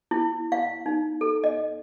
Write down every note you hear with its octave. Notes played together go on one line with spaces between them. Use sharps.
E4
F5
D#4
A4
D#5